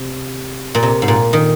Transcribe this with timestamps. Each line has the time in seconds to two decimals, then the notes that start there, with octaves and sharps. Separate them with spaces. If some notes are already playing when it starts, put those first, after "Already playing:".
Already playing: C3
0.75 A#2
0.83 C3
1.02 G#2
1.08 A#2
1.33 D#3